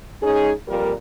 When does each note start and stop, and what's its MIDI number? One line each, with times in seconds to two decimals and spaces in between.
0.22 0.51 44
0.22 0.51 56
0.22 0.51 61
0.22 0.51 63
0.22 0.51 68
0.68 0.93 41
0.68 0.93 46
0.68 0.93 55
0.68 0.93 70